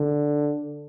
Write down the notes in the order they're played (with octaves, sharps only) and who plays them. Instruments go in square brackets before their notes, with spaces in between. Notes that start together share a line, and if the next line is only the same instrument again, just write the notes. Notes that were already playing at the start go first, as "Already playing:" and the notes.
Already playing: [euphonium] D3